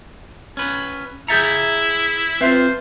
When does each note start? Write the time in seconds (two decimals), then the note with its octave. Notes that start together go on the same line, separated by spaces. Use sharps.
0.57 C#4 B4
1.28 E4 G#4 E5 A#5 G6 A6 C#7
2.41 C4 F4 B4 C5 E5 C7